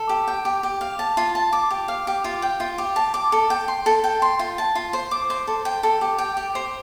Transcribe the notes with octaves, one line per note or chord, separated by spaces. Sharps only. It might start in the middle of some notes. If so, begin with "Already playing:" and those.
Already playing: A4
G4
G5
G4
G4
F5
A5
F4
A5
D6
G4
F5
G4
F4
G5
F4
G4
A5
D6
A4
G5
C6
A4
G5
C6
F4
A5
F4
C5
D6
C5
A4
G5
A4
G4
G5
G4
C5